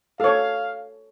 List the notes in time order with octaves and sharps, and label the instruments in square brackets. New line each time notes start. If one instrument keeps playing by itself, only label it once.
[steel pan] A4 C#5 [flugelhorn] F5